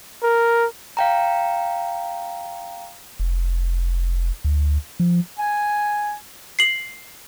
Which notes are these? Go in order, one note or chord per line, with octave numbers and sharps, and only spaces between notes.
A#4
F5 G5 A#5
F1
D2
F3
G#5
C7 F#7